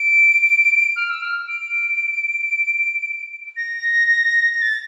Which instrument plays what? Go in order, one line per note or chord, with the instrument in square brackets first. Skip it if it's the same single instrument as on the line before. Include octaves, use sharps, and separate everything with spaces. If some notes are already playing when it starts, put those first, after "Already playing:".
Already playing: [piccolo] D7
F6
E6
F6
D7
A#6
A#6
A6